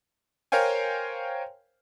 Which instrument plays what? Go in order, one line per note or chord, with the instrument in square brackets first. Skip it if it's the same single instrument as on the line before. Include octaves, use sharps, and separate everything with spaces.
[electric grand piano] A#4 C5 C#5 F5 G5 G#5